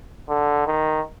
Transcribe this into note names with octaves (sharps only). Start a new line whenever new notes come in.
D3
D#3